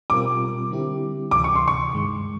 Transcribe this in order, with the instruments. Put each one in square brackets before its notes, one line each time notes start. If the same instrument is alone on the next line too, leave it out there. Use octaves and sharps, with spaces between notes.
[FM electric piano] B2 G3 C4 F4 A#4 [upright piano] D6
[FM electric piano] D3 G3 C4 E4 G4
[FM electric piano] D2 C3 E3 [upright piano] D6
[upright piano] C#6
C6
C#6
[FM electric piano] G2 D#3 G#3